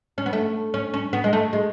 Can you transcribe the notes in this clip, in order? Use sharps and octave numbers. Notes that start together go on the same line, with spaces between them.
C#4
B3
A3
C#4
C#4
B3
G#3
A3
G#3